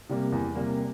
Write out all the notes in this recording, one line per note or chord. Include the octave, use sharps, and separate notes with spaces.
C3 G3 A#3
E2
C3 G3 A#3